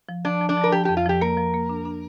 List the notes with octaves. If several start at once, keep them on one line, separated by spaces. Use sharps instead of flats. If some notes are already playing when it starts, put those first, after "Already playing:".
F3
F3 D4
F3
D4
F3
A#4
F3 G4
F2 G4
F4
F3 G4
A#3 A#4
F3
A#3
D4
D4